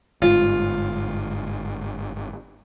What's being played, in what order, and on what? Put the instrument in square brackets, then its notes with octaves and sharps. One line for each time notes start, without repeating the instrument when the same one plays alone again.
[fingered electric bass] G1 G#2 [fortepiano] F4